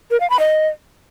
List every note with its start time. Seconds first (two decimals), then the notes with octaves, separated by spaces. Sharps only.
0.11 A#4
0.20 F5
0.30 B5
0.39 D#5